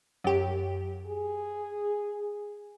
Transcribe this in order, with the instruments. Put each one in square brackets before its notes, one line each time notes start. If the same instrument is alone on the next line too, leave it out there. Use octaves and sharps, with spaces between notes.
[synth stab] F#2 G4
[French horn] G#4